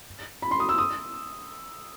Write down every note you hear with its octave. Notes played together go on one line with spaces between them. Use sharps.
B5
C6
D#6
E6
D#6